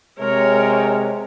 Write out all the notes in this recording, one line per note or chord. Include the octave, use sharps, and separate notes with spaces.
C3 G#3 A#4 C#5